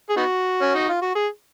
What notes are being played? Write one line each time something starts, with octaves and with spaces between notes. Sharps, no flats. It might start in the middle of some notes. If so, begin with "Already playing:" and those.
G#4
B3 D#4 F#4
C#4
D#4
F4
F#4
G#4